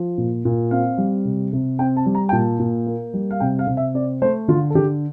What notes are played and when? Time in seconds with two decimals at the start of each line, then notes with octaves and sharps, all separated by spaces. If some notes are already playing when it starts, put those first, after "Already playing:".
Already playing: F3
0.18 A#2
0.45 A#2
0.71 C4 F5
0.98 G3
1.25 C3
1.53 C3
1.79 C4 G5
1.97 A5
2.06 G3
2.15 A#5
2.29 G5
2.32 A#2 A5
2.59 A#2
2.86 A#3
3.13 G3
3.31 F5
3.40 C3 G5
3.59 F5
3.67 C3
3.77 E5
3.94 C4 D5
4.22 A3 C5
4.48 D3 F4
4.70 A4
4.75 D3 G4